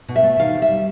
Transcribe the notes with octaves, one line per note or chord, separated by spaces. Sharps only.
B2
E5
A3
D#3 F5
C3
E5
G3